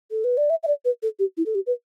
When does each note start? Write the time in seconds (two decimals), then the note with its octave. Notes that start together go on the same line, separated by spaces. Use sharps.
0.11 A4
0.24 B4
0.37 D5
0.50 E5
0.63 E5
0.67 D5
0.85 B4
1.03 A4
1.19 G4
1.37 E4
1.46 A4
1.55 G4
1.67 B4